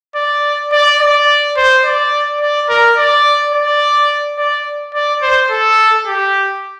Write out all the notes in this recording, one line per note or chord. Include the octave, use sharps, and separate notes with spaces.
D5
D5
D5
C5
D5
D5
A#4
D5
D5
D5
D5
C5
A4
G4